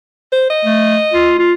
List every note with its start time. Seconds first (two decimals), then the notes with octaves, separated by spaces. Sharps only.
0.32 C5
0.50 D#5
0.65 A3
1.13 F4
1.39 F4